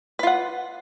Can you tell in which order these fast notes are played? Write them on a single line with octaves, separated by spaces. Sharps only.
B4 F4 F#5